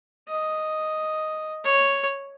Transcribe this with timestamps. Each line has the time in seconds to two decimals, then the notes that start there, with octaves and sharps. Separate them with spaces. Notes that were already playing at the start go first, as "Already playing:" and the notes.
0.28 D#5
1.64 C#5